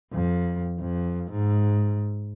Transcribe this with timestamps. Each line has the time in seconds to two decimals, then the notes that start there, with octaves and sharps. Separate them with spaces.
0.13 F2
0.80 F2
1.32 G#2